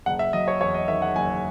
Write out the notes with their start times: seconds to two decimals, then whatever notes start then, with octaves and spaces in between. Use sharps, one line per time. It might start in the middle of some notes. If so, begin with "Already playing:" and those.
0.06 F#1 F#5
0.19 E5
0.33 F#3 D#5
0.48 C#5
0.61 E2 C#5
0.74 D#5
0.88 D#3 E5
1.02 F#5
1.16 F#1 G#5